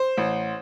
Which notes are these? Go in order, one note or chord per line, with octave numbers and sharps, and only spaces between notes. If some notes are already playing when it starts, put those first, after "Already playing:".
Already playing: C5
A1